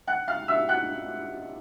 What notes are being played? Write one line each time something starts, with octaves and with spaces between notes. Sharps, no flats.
F#5 F#6
F5 F6
E5 E6
F#5 F#6